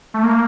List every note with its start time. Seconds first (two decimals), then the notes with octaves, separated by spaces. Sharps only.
0.14 A3
0.23 A#3